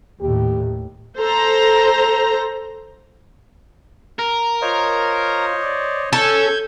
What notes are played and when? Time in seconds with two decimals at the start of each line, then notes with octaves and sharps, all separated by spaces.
0.21 D#2 A2 G4
1.17 A4 C5 A#5
4.19 A#4
4.62 F4 C5 C#5 D#5
5.63 D5
6.13 C#4 A4 G6 G#6